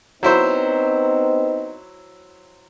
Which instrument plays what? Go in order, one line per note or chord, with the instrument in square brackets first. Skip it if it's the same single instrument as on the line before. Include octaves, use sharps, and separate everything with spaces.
[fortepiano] F#3 E4 C5 [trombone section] B3 C4 D#4